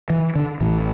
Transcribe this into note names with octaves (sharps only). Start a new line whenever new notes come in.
E3
D3
A1 A2 E3